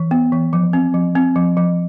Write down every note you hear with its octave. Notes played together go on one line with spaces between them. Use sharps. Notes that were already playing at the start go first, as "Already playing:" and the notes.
Already playing: E3
B3
E3
F3
C4
F3
C4
F3
F3